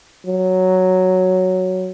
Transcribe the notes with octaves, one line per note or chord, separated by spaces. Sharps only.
F#3